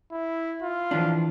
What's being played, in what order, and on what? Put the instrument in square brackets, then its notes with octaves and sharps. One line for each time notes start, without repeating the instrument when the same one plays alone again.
[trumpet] E4
F4
[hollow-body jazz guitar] E3 F3 D4